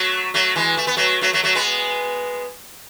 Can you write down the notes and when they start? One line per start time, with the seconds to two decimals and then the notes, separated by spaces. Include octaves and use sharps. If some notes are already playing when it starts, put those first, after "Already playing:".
Already playing: F#3 A3
0.34 F#3 A3
0.56 E3 G#3
0.77 A3
0.87 B3
0.97 F#3 A3
1.21 F#3 A3
1.33 F#3 A3
1.44 F#3 A3
1.55 G#3 B3